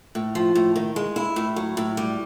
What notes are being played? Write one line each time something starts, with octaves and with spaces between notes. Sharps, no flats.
A2
F3
A2
D#3
G#3
E4
A2
F#3
A2
G3